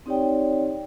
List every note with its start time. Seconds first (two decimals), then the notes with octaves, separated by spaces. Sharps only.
0.06 C4 D#4 G4 C#5 D5 G5